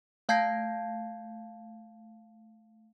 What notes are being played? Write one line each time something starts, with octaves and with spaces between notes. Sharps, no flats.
A3 F5 A5 G6 G#6 C7